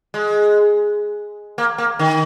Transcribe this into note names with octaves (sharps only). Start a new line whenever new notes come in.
G#3
A#3
A#3
D#3